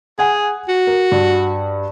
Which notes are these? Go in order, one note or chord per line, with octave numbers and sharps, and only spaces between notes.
G#4 F#5 G#5
F#4
A#4
G2